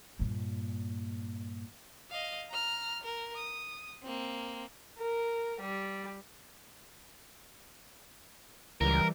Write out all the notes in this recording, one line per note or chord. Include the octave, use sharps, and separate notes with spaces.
G2 A#2
D#5 F5
A#5 F6
A#4
D#6
A#3 C4
A#4
G3
C#2 E3 G3 A#4